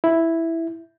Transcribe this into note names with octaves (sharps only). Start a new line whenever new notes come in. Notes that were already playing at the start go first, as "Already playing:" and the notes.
E4